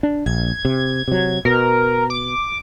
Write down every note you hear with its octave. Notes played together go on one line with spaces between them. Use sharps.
D4
A#1 G#6
C3
C3 F#3
B2 A#4
D6